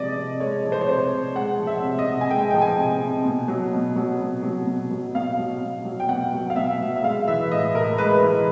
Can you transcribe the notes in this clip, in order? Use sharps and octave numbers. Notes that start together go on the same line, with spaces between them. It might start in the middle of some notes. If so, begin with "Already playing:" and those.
Already playing: C3 F3 G#3 D5 D#5
C3
G#3 C#5
F3
C5
C#5
C3 C5
C3
G#3 F#5
F3
E5
C3
D#5
C3
G#5
G#3 G5
F3 G5
G#5
C3
C3
B2
F#3
B2
F#3
B2
F#3
B2
F#3
B2 F5
F#3
B2
F#3
G5
B2 F#5
F#3
F5
B2 E5
F#3
E5
G#3 F5
E3 E5
A2 D#5
A2 A#4
G#3 B4
E3